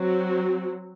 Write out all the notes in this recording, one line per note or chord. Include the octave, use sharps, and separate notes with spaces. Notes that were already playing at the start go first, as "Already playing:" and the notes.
Already playing: F#3 C4 F#4